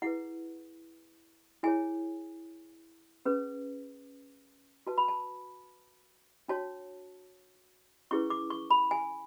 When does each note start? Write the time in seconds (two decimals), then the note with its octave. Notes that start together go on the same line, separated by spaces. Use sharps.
0.02 E4 G#4 B4 F#5
1.63 E4 G#4 C#5 G#5
3.25 C#4 G#4 B4
4.87 F#4 B4 A5
4.98 B5
5.08 A5
6.48 D4 F#4 C#5 A5
8.11 C#4 E4 G#4 B4 C#6
8.30 D6
8.50 C#6
8.70 B5
8.91 G#5